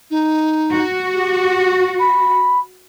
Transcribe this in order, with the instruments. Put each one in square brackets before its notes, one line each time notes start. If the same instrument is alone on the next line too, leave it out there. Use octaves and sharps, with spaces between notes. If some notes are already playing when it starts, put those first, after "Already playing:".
[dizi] D#4
[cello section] F#4
[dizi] G4
B5